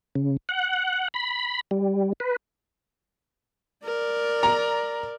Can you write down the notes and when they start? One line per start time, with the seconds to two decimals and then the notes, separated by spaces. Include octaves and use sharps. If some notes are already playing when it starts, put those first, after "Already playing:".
0.15 C#3
0.49 F#5
1.14 B5
1.71 G3
2.20 B4
3.85 A#4 D5
4.43 A#5